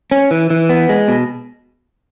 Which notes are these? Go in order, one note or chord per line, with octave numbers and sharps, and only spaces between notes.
C#4
E3
E3
B3
G#3
B2